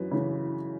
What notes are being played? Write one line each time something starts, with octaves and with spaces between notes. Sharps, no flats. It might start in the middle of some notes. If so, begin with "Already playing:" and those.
Already playing: F#2 E3 B4
C#3 E3